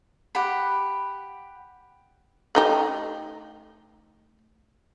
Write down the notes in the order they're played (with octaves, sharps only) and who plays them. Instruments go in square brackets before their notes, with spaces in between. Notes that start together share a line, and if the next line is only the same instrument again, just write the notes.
[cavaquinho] G4 F#5 B5
[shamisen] A3 D#4 G4